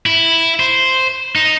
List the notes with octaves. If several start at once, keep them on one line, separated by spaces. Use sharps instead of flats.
E4
C5
D#4